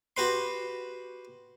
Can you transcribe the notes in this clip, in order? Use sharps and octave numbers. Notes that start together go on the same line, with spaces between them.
F#4 G4 B4 C6